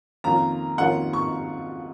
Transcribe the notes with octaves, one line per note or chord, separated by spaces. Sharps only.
F2 D#3 A#3 C#4 F4 A#5
F2 D#3 A#3 C#4 F4 F#5
C#6